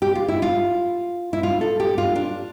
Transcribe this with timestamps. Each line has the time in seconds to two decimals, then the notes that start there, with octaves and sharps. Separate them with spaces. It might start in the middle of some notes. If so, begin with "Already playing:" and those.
0.02 G4
0.15 F4
0.28 E4
0.42 F4
1.33 E4
1.43 F4
1.61 A4
1.80 G4
1.98 F4
2.16 D4